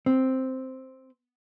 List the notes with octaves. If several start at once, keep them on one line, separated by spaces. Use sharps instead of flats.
C4